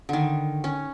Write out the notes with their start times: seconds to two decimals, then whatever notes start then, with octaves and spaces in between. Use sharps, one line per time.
0.09 D3 D#3
0.64 C#4